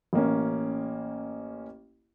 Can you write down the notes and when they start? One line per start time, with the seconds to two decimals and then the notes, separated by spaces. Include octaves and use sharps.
0.13 A1 A#3 C#4